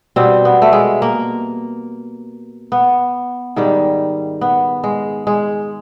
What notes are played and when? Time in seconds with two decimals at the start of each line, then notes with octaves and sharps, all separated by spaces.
0.16 B2 G3 C4
0.45 B3
0.62 A3
0.72 G#3
1.02 A#3
2.72 B3
3.56 G#2 D#3 G3
4.41 B3
4.84 G#3
5.27 G#3